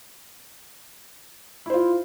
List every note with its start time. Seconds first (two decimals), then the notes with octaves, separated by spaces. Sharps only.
1.66 E4
1.70 C5
1.74 F4